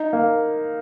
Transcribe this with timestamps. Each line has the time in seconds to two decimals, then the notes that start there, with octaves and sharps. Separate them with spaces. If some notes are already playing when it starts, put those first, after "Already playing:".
Already playing: D#4
0.13 A#3